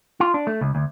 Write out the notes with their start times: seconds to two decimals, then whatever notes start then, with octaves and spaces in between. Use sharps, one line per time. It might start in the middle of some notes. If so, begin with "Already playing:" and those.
0.20 F4
0.34 D4
0.47 A3
0.61 C#2
0.75 D2